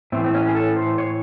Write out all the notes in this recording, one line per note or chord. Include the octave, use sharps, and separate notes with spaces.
A2 E3 C4
C4
C#4
G#4
A4
C5
C#5